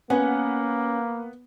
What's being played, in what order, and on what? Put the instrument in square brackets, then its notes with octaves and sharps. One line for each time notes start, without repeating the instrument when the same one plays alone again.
[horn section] A#3 [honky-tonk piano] B3 F#5 [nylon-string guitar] C#4